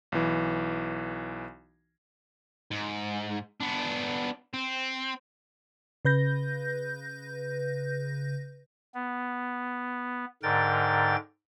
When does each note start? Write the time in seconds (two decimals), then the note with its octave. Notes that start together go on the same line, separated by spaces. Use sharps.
0.12 B1 E3
2.71 G#2
3.60 B3 D4
4.54 C4
6.05 C#3 B4 G6 A#6
8.95 B3
10.43 G#2 D3 A#4 G5 A6